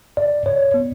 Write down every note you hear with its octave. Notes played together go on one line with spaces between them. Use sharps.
D5
C#5
B3